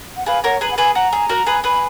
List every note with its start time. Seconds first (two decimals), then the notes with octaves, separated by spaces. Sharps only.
0.17 F#5
0.26 G#4 B4 F5
0.44 A#4 C#5 F#5
0.61 G#4 B4 A#5
0.71 F#5
0.78 G#4 B4 G#5
0.95 F#4 A#5
1.13 G#4
1.29 F#4 A#4
1.46 G#4 B4
1.64 G#4 B4 B5